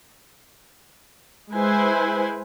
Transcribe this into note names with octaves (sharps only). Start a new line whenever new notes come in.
G#3 E4 B4 C5 G#5